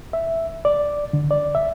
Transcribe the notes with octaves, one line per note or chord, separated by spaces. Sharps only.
E5
D5
D3
D5
E5